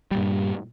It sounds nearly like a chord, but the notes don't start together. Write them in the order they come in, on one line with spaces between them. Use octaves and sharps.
G3 A#2 G2